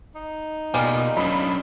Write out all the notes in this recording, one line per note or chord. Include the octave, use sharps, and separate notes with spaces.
D#4
B2 G3 G#3 A#3 F4
F#3 C#4 D4 B5